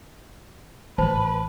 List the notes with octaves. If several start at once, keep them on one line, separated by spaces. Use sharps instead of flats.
A1 B4 C5 A5